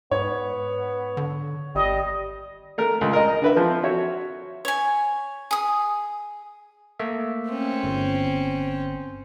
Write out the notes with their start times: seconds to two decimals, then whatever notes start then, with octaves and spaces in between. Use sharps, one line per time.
0.11 G#2 B3 C#5
1.17 D3
1.75 G#1 G3 D#5
2.78 A3 A#4
3.01 C#2
3.13 A#4 D#5
3.42 D3 B4 E5
3.57 F3 C4
3.83 F#4 C#5 E5
4.65 C#5 G#5
5.51 G#4 D#6
6.99 A3 A#3 E5
7.49 C4 C#4
7.83 G1